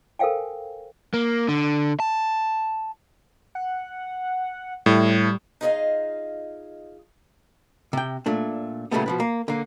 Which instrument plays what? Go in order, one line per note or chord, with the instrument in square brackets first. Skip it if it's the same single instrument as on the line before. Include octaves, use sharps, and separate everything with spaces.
[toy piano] A4 A#4 C5 F5 G5 G#5
[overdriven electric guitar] A#3
D3
A5
[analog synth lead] F#5
[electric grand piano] A2 [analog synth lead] G3
[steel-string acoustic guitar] D#4 F4 G#4 B4 D#5 F5
[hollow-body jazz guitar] C3 G5
A#2 A3 D4
A#2 C#3 F#3 G3 A3 B3
B2 F3 B4
A#3
D3 A#3